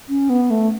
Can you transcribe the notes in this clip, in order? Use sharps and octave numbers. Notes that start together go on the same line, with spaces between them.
C#4
B3
A3